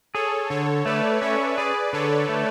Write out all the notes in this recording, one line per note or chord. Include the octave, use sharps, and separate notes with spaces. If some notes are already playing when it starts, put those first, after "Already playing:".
G#4 A4 C#5
D3 A4 C#5
A3 B4 D5
C#4 C#5 E5
G#4 B4 D5
D3 A4 C#5
A3